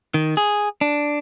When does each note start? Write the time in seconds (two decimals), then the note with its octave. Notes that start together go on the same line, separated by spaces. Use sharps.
0.14 D#3
0.37 G#4
0.81 D4